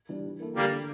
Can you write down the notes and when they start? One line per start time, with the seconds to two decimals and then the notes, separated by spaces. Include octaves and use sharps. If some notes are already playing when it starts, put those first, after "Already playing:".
0.09 E3 G3 D4
0.25 E3
0.40 A#3 E4 A4
0.55 D3 G3 A#3
0.71 A3 D4